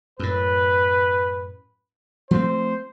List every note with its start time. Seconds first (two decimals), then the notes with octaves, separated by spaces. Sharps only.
0.19 F#2 A2 B4
2.31 F3 A3 C4 C5